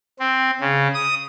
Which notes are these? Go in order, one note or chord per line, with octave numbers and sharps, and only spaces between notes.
C4
C#3
D#6